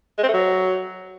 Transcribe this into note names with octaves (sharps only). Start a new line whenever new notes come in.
G#3
C4
A3
F#3